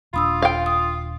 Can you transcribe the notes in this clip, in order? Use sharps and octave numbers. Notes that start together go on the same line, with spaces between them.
D#1 D4 F4 B5 D#6 E6
F5 G5
D#6